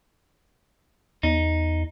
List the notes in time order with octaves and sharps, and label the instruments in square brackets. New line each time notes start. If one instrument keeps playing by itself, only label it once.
[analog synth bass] E2 [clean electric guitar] D#4